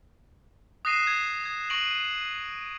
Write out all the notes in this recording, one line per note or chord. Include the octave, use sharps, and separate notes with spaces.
D#6 F#6 A#6 C7 D#7 E7
G#6
D#6 G#6
C#6 A#6 D7 D#7 F#7